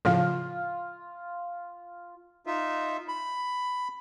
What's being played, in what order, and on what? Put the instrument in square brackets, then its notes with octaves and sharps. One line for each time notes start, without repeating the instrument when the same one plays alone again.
[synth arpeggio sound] A2 C#3 F3 [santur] F4
[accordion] D#4 F4 E5
[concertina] B5